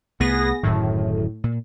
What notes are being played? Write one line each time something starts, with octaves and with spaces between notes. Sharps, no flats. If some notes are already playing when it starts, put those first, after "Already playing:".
C2 A3 B3 G#4 A#6
D1 F#2 A2 D#3
A#2